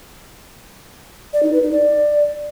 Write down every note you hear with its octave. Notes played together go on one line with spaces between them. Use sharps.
D5
D#4
B4
D#4
D5